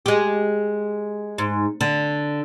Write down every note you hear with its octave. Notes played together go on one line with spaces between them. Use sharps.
G#3 G4
G#2
D3